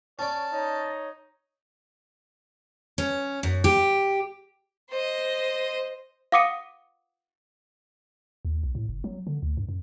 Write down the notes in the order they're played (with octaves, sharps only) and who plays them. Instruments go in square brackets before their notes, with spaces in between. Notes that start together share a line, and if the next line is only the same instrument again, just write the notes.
[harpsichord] C#4 D5 [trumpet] C#5 [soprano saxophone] A5
[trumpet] D#4 [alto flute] C#5
[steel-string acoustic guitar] C#4
F#2
G4
[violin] C5 D#5
[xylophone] F5 F#5 D6 D#6 C#7 D#7
[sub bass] D#2
B1
A2
F#1
F#3
D3
D2
G2
F#2